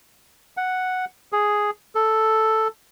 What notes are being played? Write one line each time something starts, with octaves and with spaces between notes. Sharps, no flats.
F#5
G#4
A4